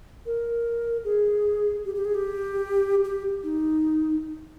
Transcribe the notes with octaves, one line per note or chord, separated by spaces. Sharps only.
A#4
G#4
G4
G4
G#4
G4
G4
D#4